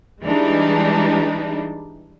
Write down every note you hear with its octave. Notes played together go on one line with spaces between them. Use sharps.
E3 G3 G#3 D4 D#4